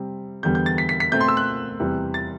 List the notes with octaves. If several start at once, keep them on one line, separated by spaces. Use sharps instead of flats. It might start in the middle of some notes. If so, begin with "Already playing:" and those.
Already playing: C3 G3 C4
E2 D3 G3 B3 G6
G6
A6
B6
B6
B6
B2 A3 C4 G6
C6
E6
F#6
E2 C3 E3 G3
A6